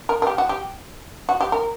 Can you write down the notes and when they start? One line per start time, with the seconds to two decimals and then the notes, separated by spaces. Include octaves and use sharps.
0.09 A#4
0.22 A#4
0.27 G4
0.38 F#4
0.49 G4
1.29 F#4
1.41 G4
1.52 A#4